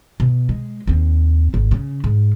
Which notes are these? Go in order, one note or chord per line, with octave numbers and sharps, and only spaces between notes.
B2
G#3
D#2 C4
G#1
C#3
G#2